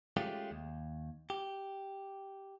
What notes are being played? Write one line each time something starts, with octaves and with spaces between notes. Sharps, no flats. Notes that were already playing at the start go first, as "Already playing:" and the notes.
G#3 A3 C#4 F4 G4
D#2
G4